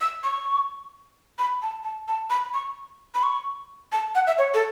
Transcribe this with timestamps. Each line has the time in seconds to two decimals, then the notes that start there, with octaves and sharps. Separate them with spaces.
0.01 E6
0.23 C#6
1.39 B5
1.62 A5
1.84 A5
2.08 A5
2.30 B5
2.54 C#6
3.15 B5
3.23 C#6
3.92 A5
4.15 F#5
4.27 E5
4.38 C#5
4.54 A4